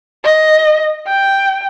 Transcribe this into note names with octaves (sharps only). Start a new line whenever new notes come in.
D#5
G5